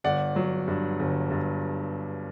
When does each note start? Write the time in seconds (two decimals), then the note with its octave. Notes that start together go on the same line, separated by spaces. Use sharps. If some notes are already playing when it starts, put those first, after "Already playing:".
0.04 G1 D5 F#5
0.36 F#3
0.68 G2
1.00 G1
1.30 G2